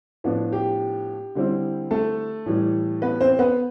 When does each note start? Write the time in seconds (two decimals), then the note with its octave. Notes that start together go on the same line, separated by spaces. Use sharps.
0.24 A2 F3 B3 D4
0.53 G4
1.35 D3 G3 C4 E4
1.91 A3 A4
2.46 A2 E3 G3
3.02 B3 B4
3.21 C4 C5
3.39 B3 B4